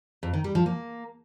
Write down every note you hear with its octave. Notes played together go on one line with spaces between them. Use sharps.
F2
D#3
G3
F3
A#3